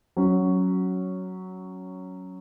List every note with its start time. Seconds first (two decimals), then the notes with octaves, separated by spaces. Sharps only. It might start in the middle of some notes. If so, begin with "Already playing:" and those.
0.17 F#3 C#4 F#4